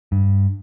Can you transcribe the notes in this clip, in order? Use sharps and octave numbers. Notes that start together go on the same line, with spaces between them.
G2